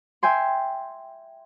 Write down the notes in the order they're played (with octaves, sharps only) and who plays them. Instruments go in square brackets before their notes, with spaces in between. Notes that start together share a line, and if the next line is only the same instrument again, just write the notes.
[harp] E5 G5 G#5 C6